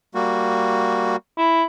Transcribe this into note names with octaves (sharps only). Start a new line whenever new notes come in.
G3 A#3 F#4
E4